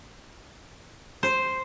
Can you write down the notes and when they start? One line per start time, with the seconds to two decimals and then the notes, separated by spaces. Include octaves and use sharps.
1.23 C5